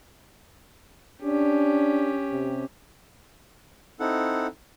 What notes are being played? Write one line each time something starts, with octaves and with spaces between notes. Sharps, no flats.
C#4 D4 G4
C3
C4 D#4 E4 A4 F#5